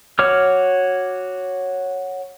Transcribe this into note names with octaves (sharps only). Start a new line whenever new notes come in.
F#4 C#5 D6 F6